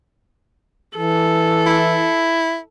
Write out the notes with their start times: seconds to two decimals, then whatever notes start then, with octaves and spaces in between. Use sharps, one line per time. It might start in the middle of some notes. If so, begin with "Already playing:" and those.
0.97 E3 A4
1.66 E4